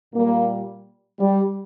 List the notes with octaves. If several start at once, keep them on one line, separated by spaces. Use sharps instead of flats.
A#2 G3 A#3
G3